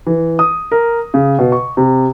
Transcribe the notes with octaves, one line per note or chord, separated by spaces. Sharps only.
E3
D#6
A#4
C#3
B2
C#6
C3